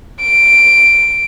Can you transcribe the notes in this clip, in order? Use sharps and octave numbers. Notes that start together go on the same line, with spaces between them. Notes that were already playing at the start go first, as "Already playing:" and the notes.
D7